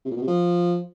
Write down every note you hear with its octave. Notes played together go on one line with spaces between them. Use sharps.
C3
A#2
B2
C3
F3